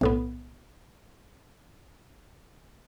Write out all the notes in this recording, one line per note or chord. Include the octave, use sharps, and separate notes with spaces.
B1 A2 B3